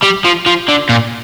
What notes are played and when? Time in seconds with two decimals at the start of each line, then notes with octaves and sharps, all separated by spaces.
0.02 G3
0.25 F3
0.46 F3
0.69 D3
0.89 A#2